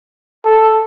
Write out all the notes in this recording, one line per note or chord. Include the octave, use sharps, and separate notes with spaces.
A4